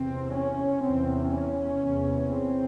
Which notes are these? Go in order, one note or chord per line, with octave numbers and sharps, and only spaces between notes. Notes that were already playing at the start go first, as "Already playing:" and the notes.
Already playing: E2 C3 C4
C#4
E2 C3 C4
C#4
E2 C3
C4